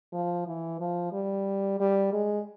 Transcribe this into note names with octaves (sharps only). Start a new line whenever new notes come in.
F3
E3
F3
G3
G3
G#3